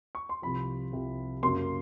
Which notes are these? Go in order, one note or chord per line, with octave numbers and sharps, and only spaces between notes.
C#6
C6
C2 C3 F3 B5
C2 C3 F3
F#2 C#3 F#3 A#3 C6